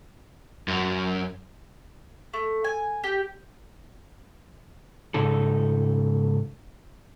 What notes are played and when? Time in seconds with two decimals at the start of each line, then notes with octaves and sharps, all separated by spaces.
0.68 F#2
2.34 A3
2.64 G#5
3.04 G4
5.14 G#2 C#3 D#4 A4